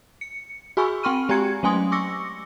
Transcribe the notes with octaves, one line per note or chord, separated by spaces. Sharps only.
C#7
F#4 G#4 G#5 B5 C#6 E6
C4 G5 C6 C#6 F6 D#7
G#3 G4 G#5 A#5 G#6 C#7
F#3 A3 C#4 G#5 C6 D#6
C#6 D6 E6 A#6 C#7